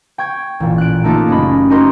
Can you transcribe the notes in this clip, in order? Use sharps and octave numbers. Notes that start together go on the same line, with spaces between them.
G5 C#6 G#6
A1 A#2
F#6 D7
A3 A#3 D#4 F4 G4 A4
F#1 C#4 D#5 B5
D#4 F#4 G4 A#4 D#5 C6